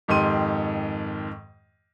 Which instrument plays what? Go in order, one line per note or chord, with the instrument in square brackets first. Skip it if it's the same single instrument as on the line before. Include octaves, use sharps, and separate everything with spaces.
[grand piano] F2 G#2 D#3 G4 C6 D#7